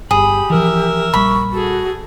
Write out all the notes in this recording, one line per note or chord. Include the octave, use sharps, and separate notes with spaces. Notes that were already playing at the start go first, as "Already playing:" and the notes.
G1 G4 G#4 B5
E3 F3 A#4 E5
A#1 G3 B5 C#6
F#4 G#4 A4